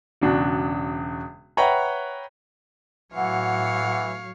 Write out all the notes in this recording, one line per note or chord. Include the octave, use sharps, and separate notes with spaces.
E1 C#3 D4 F#4
B4 C#5 E5 F#5 G5 A#5
A2 E3 F#3 C#5 F5 F#5